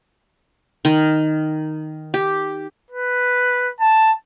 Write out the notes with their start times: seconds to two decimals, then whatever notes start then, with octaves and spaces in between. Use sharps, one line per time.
0.85 D#3
2.14 G4
2.91 B4
3.81 A5